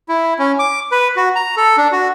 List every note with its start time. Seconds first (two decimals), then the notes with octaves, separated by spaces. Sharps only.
0.09 E4
0.39 C#4
0.59 D6
0.92 B4
1.16 F#4
1.36 A#5
1.57 A4
1.77 D4
1.92 F#4